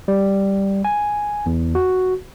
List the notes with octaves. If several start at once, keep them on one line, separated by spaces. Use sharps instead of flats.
G3
G#5
E2
F#4